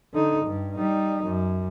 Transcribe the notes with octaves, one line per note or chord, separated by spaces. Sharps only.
D3 D#4
G2
G3 D#4
F#2